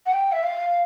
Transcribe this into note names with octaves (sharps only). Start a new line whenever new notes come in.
F#5
G5
E5
F5